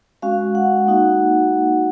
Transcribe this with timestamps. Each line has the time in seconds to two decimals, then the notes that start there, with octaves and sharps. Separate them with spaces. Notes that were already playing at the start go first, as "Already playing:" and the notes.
0.22 G#3 C#4 F#4 F5
0.55 F#5
0.87 A#3 D#4 F#4